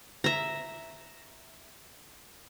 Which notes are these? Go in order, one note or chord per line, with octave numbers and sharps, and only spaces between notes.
E5 A#5